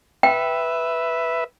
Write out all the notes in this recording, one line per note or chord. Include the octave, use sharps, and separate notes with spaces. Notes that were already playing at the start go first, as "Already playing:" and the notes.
B4 E5 G5